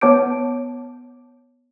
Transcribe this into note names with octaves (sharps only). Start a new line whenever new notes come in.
B3 C#5 A5 D6 G6 D7